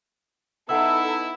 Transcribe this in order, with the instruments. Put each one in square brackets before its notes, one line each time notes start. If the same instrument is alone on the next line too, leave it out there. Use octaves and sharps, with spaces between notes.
[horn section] B3 E4 [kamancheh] D#4 A4 [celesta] F#5 E6